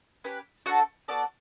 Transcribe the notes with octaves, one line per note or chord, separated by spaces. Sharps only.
C#4 G4 B4
A3 D4 F#4 A4 F#5
B3 F#4 A4 D5 D6